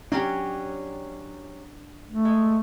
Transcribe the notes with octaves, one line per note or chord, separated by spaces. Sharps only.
F#3 C#4 D4 G4
A3
G#3